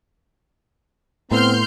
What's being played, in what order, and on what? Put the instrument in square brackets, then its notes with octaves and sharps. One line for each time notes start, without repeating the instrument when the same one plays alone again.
[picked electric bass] A2 [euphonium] B3 [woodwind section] C4 [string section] C6 F6 G6